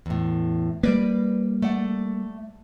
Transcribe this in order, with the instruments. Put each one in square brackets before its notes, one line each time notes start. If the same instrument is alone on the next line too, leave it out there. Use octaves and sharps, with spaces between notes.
[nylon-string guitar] E2 A2
[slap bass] G3 A#3 [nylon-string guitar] B4 D5
[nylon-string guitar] A3 D5 F#5